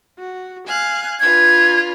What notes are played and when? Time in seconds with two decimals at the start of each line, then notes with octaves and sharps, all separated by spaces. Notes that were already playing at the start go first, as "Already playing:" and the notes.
0.17 F#4
0.67 F5 G#5 F#6
1.20 D4 F4 B4 G#6